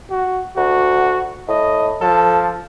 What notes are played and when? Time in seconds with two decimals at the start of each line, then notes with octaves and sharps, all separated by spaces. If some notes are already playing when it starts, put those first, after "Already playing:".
0.10 F#4
0.56 D2 F#4
1.48 A2 D#5
2.01 F3 A4